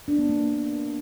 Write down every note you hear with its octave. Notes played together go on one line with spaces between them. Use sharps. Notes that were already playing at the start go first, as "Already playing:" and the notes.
D4
B3
A#3